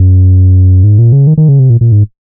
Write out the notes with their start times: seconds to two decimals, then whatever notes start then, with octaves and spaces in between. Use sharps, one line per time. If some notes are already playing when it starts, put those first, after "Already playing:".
Already playing: F#2
0.84 G#2
0.99 A#2
1.12 C#3
1.27 D#3
1.38 D#3
1.49 C#3
1.59 C3
1.70 A#2
1.81 A#2
1.92 G#2